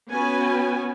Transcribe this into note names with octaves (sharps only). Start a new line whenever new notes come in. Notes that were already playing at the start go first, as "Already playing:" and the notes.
B3 C#4 F#4 B4 G#5